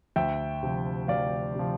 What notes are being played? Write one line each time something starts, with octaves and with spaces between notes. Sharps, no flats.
D2 E5 G5
C3 F3
D2 D5 F5
C3 F3